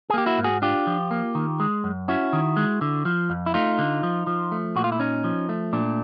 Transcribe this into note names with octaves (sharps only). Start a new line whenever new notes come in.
G#4
A#3 G4
E4 F#4
G#2
F#4 G#4
D4 F4 G4
F3
A#3
D#3
G#3
F#2
C#4 E4 F#4
D#3
G#3
D3
F3
F2
E4
A3 D#4 F4
D3
F3
F3
A3
A#2 F#4
F4
E4
C#4 D#4
F3
A3
A#2 D4